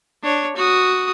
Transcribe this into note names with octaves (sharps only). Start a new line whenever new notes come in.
D4 C#5
F#4 D#6